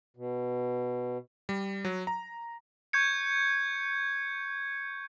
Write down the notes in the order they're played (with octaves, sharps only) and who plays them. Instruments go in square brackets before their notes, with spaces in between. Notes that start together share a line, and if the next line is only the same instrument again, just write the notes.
[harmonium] B2
[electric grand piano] G3
F#3
A#5
[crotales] C#6 G6 G#6 C#7